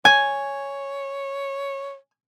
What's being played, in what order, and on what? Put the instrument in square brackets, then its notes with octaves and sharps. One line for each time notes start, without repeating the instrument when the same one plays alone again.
[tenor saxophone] C#5 [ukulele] G#5 [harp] G#6